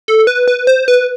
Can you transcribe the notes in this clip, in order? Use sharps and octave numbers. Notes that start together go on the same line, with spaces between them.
A4
B4
B4
C5
B4